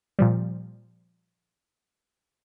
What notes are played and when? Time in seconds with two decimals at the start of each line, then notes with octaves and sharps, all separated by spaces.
0.19 A#2 F3 G3